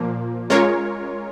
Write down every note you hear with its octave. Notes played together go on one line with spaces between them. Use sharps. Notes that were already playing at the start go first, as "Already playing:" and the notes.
Already playing: A#2 F3 A#3
G#3 C#4 F4 A#4 C#5